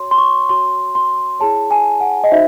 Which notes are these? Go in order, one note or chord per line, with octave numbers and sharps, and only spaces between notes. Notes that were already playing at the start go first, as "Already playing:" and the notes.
Already playing: F#4 C#5 C6
C6
C#6
F#4 C#5 C6
C6
E4 G#4 C#5 A5
G#5
F#5
D#5
D#4 F#4 C5 E5